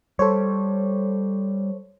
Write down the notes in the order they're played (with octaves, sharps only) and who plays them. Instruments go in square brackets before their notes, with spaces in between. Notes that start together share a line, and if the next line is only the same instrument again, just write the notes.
[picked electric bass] G3 [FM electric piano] A4 C5 C#5